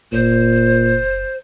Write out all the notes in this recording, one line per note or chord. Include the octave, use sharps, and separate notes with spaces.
F#1 A#2 C5